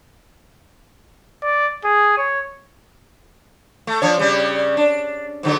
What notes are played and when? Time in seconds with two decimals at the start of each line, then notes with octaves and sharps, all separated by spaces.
1.42 D5
1.84 G#4
2.17 C#5
3.87 A3
4.02 F3 D4 C#5
4.17 C#3 G3 C#4
4.77 D4
5.43 G#2 D3 F#3